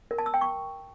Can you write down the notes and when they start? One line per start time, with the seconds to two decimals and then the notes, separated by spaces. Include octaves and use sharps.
0.11 A#4
0.18 A5
0.26 E6
0.34 G5
0.41 C#6